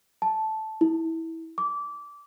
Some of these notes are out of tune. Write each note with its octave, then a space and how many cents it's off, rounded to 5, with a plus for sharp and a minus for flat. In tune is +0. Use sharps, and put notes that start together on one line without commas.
A5 -10
E4 -20
D6 -20